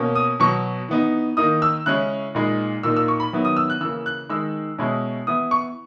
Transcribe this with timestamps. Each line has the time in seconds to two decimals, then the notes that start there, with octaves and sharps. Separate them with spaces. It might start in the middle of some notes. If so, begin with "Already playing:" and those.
Already playing: B2 A#3 C#4
0.15 D#6
0.40 B2 F#3 B3 C#6
0.88 E3 B3 D#4
1.37 D#3 A#3 D#4 D#6
1.62 E6
1.86 C#3 G#3 C#4 E4 F#6
2.35 A#2 G#3 D#4
2.83 A#2 A#3 D#4 E6
2.97 E6
3.08 C#6
3.20 B5
3.33 D#3 F#3 B3 E4
3.45 D#6
3.57 E6
3.70 F#6
3.81 C#3 E3 A#3 E6
4.06 F#6
4.29 D#3 G#3 D#4 E6
4.79 B2 G#3 C#4 E4
5.27 E3 B3 E4 D#6
5.51 C#6